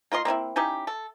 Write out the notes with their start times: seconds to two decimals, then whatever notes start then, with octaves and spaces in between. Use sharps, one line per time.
0.12 A#3 F4 D#5 C6
0.25 A#3 C4 D#4 E4
0.56 C#4 D#4 E4 G4
0.87 A4